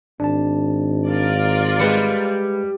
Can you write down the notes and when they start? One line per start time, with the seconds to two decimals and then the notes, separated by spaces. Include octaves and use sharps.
0.20 G#1 D4 A5
1.06 F4 A#4 D5
1.79 G3 G#3 B4 C#7